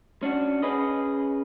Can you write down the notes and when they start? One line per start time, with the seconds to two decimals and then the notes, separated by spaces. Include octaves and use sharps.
0.23 C#4 D4 F#4
0.62 C#4 G#4 B4 D#5